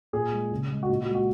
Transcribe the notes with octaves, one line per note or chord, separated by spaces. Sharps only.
A#2 G#4
G#3
C#3
G#3
F#4
A#2 D#4
F#4
G#3
F#4